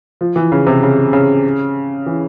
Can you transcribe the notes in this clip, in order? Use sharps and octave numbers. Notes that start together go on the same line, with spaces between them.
F3
E3
C#3
C3
C#3
C#3
E3